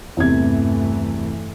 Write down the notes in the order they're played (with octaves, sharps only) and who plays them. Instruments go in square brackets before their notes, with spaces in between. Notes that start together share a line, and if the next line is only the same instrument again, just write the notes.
[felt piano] E2 C3 G#6 [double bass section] G2 E3 A3